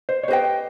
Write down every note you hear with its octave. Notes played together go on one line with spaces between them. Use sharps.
C5
C#5
G4 B4 C5 D#5 G5